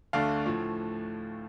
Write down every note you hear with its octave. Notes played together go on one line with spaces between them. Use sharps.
D2 D3 A3 D4 F5
A2 F3 A3